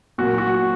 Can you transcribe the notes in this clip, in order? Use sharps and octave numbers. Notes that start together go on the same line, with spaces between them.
A#2 F#3 A#3 F#4
F#4